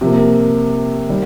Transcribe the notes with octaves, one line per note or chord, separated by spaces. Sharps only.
C3 F3 A#3
D#3 G3